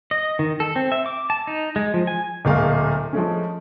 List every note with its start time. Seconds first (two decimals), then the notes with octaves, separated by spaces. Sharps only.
0.11 D#5
0.39 D#3
0.60 A4
0.76 C4
0.92 E5
1.06 D6
1.30 A5
1.47 D#4
1.76 G#3
1.94 F3
2.07 G#5
2.45 D1 A#2 G#3 F5
3.13 F3 G#3 A3 C#4